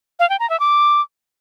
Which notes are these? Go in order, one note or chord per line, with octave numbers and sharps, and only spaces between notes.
F5
G5
A#5
E5
D6